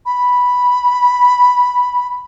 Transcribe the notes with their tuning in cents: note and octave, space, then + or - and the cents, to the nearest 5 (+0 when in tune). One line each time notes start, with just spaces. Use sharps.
B5 -5